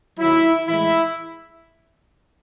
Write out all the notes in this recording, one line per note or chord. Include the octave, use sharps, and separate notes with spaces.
D#2 D#3 F#3 E4
A2 E3 G#3 E4